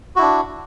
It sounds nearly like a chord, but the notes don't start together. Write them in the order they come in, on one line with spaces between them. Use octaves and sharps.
F#4 E4 D4